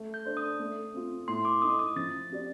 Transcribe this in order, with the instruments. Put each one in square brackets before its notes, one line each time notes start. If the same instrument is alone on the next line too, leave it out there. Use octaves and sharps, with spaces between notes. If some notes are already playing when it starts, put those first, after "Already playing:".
Already playing: [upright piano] A3
[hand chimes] G6
[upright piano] D4 A4 C5
[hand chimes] D#6
[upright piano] A3
C4 F4
[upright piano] A2 [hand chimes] C6
[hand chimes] D6
[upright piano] A3 D#4 [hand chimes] D#6
[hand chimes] D#6
[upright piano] F3 [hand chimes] A6
[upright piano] C4 G4 D5